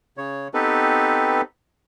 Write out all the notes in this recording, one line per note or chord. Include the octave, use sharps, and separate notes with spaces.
C#3 C#5
B3 C4 D#4 G4 A4 B4